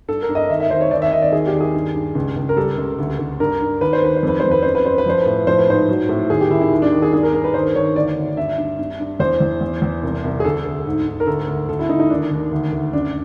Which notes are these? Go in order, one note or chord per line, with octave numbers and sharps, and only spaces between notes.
G2 A4
A#4
G2
D#5
D#2 E5
E5
D#2 C5
C#5
D#2 D5
E5
D#2 D#5
D5
D#2 G#4
G4
D#2
G#4
G2
G2
C#2
C#2
A#4
G3 A4
C#2
D2
D2
G2 A#4
G2
D#2 B4
C5
D#2 B4
C5
F2
B4
F2 C5
B4
F#2 C5
B4
F#2 C5
B4
F3 C5
A2 B4
F3 C5
B4
G#2 C5
F#3
A2
D#2 G#4
G4
D#2 E4
E4
D#2
D4
D#2 D#4
G#4
G2 G#4
A#4
G2 A#4
B4
D#2 C5
D#2 C#5
D2 D5
D2
G2 E5
G2
G2
G2
E2 C5
E2
E2
E2
C2
C2
G#4
D2 A4
D2
G#2
G#2
A#4
D2 A4
D2
D2 A4
E4
D2 D#4
D#4
D#2 D4
D#2
D2
D2
F#2 D4